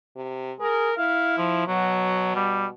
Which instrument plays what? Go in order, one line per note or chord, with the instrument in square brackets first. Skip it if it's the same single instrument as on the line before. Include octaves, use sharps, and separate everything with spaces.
[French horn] C3
[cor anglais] G#4 [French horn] A#4
[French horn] E4 [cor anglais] F5
[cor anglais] F3
[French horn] B2 [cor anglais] F#3
[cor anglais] G3